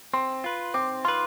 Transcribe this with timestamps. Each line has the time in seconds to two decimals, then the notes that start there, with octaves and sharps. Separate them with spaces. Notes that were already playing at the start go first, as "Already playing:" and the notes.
0.14 C4 C6
0.44 F4 B4
0.74 C4 D6
1.05 F4 B4 C6